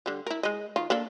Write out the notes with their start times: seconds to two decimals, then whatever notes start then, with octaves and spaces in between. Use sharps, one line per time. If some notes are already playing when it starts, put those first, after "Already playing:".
0.06 D3 G3
0.26 E4 A#4
0.43 G#3 D#5
0.76 D#3 F4
0.90 A#3 D4 A4